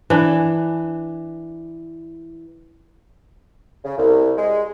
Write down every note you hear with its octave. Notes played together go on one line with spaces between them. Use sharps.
E3 D4
C#3
C2
G#3